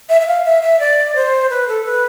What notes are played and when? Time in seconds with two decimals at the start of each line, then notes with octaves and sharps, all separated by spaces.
0.09 E5
0.21 E5
0.27 F5
0.44 E5
0.62 E5
0.80 D5
1.15 C5
1.50 B4
1.68 A4
1.85 B4